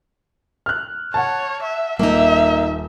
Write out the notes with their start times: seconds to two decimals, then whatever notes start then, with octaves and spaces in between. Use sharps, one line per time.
0.66 F6 F#6
1.14 C#5 F#5 A5
1.63 E5
1.99 D#1 A#3 D#4 E5